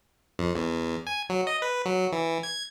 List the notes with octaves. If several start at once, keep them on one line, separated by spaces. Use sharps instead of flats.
F2
E2
G#5
F#3
D#5
B4
F#3
E3
G#6